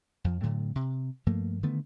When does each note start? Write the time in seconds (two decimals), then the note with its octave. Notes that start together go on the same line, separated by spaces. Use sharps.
0.24 F2 F3
0.42 A2 D3 F#3 A3
0.76 C3
1.27 G2 F3 A3 A#3
1.63 D3 D#3 A3 B3